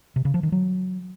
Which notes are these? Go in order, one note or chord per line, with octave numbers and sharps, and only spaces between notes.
C3
C#3
F3
D#3
F#3